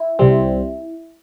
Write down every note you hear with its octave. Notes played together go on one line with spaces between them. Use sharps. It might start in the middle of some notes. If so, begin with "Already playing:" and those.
Already playing: E4
C2 C3 G3 C4